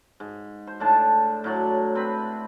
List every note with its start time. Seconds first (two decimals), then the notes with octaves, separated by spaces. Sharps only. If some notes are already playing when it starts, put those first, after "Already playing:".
0.20 G#2
0.67 C5
0.80 A2 D4 A5
1.44 A2 F#3 D5
1.95 C4 B4 B5